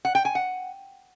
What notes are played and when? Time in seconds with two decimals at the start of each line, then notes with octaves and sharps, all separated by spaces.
0.05 F#5
0.15 G5
0.25 G#5
0.35 F#5